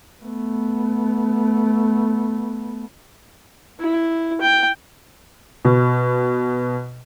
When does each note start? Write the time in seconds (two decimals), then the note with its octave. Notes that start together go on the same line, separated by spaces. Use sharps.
0.23 A3 B3
3.80 E4
4.41 G5
5.65 B2